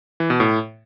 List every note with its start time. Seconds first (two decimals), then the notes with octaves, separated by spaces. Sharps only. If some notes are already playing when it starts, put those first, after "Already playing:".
0.20 E3
0.30 B2
0.40 A2